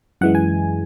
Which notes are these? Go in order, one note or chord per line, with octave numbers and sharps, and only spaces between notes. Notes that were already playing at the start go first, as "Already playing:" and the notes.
F#2 E3 G#3 F#5
G#5